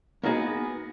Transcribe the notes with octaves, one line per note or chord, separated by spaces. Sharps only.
A#3 B3 D#4 F#4 G#4